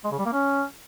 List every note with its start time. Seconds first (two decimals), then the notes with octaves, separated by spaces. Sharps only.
0.04 G#3
0.11 C#3
0.19 G3
0.26 A#3
0.33 C#4